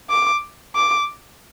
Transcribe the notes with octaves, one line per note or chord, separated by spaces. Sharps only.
D6
D6